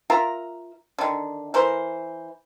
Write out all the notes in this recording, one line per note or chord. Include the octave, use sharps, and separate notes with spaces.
F4 A#4 E5 A#5
D3 D#3
E3 A#4 C5